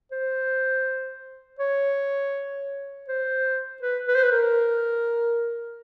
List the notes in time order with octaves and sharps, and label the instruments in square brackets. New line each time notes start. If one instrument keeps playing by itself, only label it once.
[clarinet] C5
C#5
C5
B4
B4
C5
B4
A#4